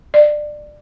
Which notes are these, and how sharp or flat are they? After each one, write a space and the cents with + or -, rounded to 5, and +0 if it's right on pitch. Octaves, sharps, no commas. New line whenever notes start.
D5 +20